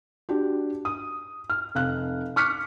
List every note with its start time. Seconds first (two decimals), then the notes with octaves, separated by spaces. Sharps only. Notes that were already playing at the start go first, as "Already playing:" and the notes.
0.29 D4 F#4 G4
0.85 D#6
1.50 F6
1.75 F1 F5 F#6
2.36 C#6 D6 F6 F#6 B6 C#7